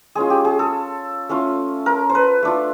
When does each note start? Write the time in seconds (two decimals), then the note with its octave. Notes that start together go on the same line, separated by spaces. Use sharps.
0.15 G#3 C#4 F4 G#4
0.30 G4
0.45 G#4
0.59 A4
1.29 A3 C#4 F4
1.86 A#4
2.10 C5
2.15 B4
2.43 A3 D4 F4